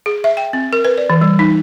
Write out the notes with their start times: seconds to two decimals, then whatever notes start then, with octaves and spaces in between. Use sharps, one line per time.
0.06 G#4
0.24 E5
0.37 G5
0.53 C4
0.73 A#4
0.85 B4
0.98 D5
1.10 E3
1.21 G3
1.39 D#4